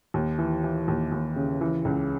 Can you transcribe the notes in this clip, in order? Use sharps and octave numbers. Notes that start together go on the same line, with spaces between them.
D#2
E3
E3
D#2
D#2
C#3
E3
C#2